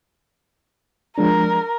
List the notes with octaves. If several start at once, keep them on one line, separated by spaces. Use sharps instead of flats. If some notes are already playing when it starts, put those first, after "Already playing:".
F3 G#3 D4 A#4